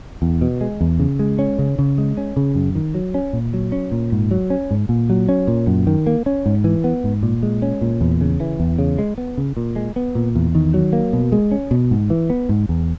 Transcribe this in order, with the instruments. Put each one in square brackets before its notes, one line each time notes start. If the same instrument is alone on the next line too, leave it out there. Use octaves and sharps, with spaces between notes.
[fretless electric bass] E2
B2
G#3
E2
C#3
G#3
C#4
C#3
C#3
G#3
C#4
C#3
F#2
D#3
F#3
C#4
A#2
F#3
C#4
A#2
G#2
F#3
C#4
G#2
A#2
F#3
C#4
A#2
F#2
D#3
A#3
C#4
G#2
E3
B3
G#2
A#2
G#3
C#4
A#2
E2
C#3
E3
E2
C#3
G#3
B3
C#3
A#2
G#3
B3
A#2
E2
D#3
F#3
A#3
B2
G#3
C#4
B2
G#2
E3
B3
G#2
E2